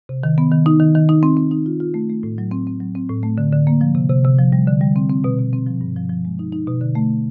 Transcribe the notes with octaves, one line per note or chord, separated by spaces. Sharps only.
C3
D#3
B3
D#3
D#4
D#3
D#3
D#4
C4
C4
D#4
F4
F4
A3
A3
A2
F#3
C4
C4
F#3
C4
A2
A3
D3
D3
A#3
F3
C3
C3
C3
F3
G3
D3
G3
C4
C4
B2
B2
C4
F3
G2
F3
F3
G#3
D#4
D#4
B2
D3
A3